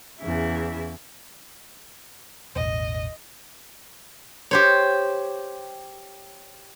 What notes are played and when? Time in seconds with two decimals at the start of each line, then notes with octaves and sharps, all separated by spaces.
0.20 E2 C#3 E4
2.56 E1 A1 D#5
4.51 G4 C5 C#5